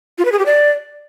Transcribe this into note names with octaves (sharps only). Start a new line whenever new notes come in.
F4
B4
G#4
G4
D5